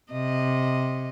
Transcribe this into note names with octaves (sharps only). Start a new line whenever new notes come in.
C3 D#5